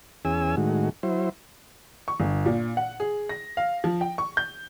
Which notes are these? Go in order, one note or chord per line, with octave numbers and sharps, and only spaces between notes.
E2 C#4 G#4 G#5 E6
A2 D#3 G#3 F#4
F#3 E4 C5
C#6
G1
A#2
F#5
G#4
A#6
F5
F3
G5
C#6
G6